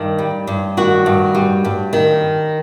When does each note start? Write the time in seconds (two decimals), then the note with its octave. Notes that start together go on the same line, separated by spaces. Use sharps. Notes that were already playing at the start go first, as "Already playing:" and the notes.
Already playing: G2 D#3
0.19 G3
0.47 G2
0.77 D#3 F#4
1.06 G2
1.35 G3
1.65 G2
1.93 D#3